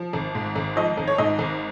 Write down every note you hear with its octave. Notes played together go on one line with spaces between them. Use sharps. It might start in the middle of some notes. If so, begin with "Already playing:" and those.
Already playing: F3
G#1
G#2
G#1
F3 D#5
G#1
C#5
G#2 D#5
G#1